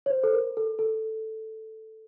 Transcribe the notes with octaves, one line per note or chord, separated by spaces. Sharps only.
C#5
C5
A4
A#4
A4
A4